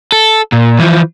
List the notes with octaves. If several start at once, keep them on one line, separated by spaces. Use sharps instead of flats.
A4
A#2
E3 F3